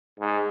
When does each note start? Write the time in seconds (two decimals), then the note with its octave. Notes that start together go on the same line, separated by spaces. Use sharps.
0.20 G#2